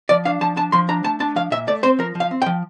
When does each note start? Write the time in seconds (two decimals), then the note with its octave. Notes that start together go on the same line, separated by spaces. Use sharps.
0.09 F3 D5
0.25 D4 F5
0.41 F3 A5
0.56 D4 A5
0.72 F3 C6
0.89 D4 A#5
1.04 A3 A5
1.20 D4 A5
1.36 F3 F5
1.51 A#2 E5
1.67 A3 D5
1.83 C4 C5
1.99 F3 A#4
2.15 F3
2.20 F5
2.31 C4
2.42 G5
2.46 F3